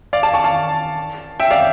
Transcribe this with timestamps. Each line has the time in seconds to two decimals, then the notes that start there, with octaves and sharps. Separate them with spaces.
0.13 D5 F5
0.23 F5 A5
0.34 A5 C#6
0.44 F5 A5
1.40 E5 G5
1.50 D5 F5